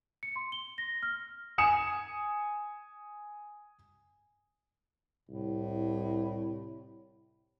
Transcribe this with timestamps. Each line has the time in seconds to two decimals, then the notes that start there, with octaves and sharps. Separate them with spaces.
0.23 C#7
0.36 C6
0.52 G7
0.78 A#6
1.03 F6
1.58 G#5 D#6 C#7 E7
5.29 C2 A2